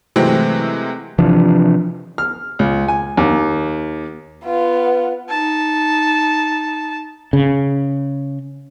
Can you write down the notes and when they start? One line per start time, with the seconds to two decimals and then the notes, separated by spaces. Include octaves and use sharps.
0.16 C3 E3 F#3 G#3 A3 C4
1.18 C3 E3 F3 D4
2.18 F6
2.59 C#2
2.88 G#5
3.17 D#2
4.44 B3 F4
5.29 D#4 A5
7.33 C#3